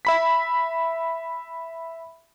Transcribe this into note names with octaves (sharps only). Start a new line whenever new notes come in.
E5 B5 B6